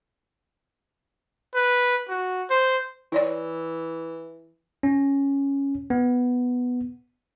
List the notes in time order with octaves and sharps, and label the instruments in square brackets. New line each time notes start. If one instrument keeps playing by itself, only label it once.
[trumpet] B4
F#4
C5
[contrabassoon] E3 [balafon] E4 C#5 D5
[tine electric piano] C#4
B3